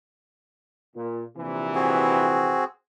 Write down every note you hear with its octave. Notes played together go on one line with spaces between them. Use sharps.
A#2
A#1 C3 E3
C4 F#4 G#4